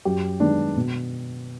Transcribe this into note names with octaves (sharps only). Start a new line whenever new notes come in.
F#2 G4
D#3 G#3 B3 D4
B2